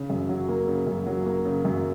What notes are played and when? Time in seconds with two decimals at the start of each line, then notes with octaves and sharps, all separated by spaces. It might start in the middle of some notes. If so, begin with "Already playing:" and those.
Already playing: C#3
0.10 F#2
0.29 F#3
0.49 A#3
0.67 C#3
0.87 F#2
1.06 F#3
1.26 A#3
1.45 C#3
1.65 F#2